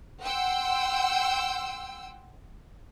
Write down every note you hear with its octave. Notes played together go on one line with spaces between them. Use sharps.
F#5 G5 C6 E6